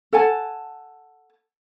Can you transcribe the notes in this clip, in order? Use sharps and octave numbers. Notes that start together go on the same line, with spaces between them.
A4 F#5 G#5 A5